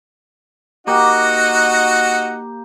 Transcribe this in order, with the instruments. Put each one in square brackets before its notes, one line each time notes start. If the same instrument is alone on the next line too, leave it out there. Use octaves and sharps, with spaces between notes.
[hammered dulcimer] A#3 G4 [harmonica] D#4 F#4 F#5